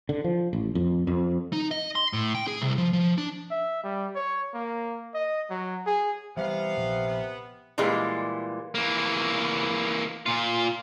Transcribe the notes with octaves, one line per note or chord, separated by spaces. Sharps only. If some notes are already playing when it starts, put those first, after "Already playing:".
D3
F3
A1
F2
F2
D#4
D#5
C6
A2
G5
G#4
C2
F3
F3
D4
E5
G3
C#5
A#3
D#5
F#3
G#4
C3 E3 G3 B3 F5
A#1
B3
A#2 E3 G3 G#3 A#3
E3 A#3
A#2 F4